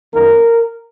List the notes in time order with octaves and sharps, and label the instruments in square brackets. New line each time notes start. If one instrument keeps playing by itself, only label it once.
[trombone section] F#2 D#3 A#3 A#4